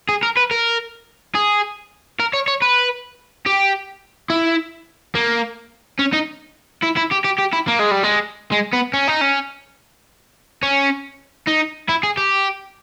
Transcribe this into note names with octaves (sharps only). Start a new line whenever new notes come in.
G#4
A#4
B4
A#4
G#4
A#4
C#5
C#5
B4
G4
E4
A#3
C#4
D#4
E4
E4
G4
G4
G4
E4
A#3
G#3
G3
G#3
G#3
B3
C#4
D#4
C#4
C#4
D#4
E4
G#4
G4